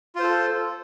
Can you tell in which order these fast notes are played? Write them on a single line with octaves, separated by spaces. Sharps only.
F4 C5 A4